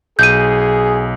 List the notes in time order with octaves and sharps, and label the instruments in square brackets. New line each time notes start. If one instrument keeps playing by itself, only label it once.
[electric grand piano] B1 [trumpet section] G#4 [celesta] G6 D#7